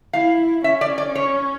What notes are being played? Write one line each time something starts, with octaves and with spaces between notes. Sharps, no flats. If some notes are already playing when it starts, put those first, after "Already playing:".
E4 F5
C#4 E5
D5
D5
C#5